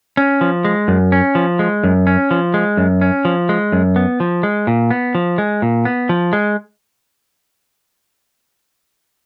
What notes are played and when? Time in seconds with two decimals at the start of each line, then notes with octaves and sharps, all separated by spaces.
0.17 C#4
0.41 F3
0.65 G#3
0.88 F#2
1.12 C#4
1.35 F3
1.59 G#3
1.84 F#2
2.07 C#4
2.31 F3
2.54 G#3
2.77 F#2
3.01 C#4
3.25 F3
3.49 G#3
3.72 F#2
3.96 B3
4.20 F3
4.43 G#3
4.67 A#2
4.91 B3
5.15 F3
5.38 G#3
5.62 A#2
5.85 B3
6.09 F3
6.33 G#3